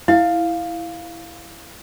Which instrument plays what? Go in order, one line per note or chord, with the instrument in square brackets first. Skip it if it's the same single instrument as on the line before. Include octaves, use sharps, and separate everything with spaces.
[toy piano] E4 [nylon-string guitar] F5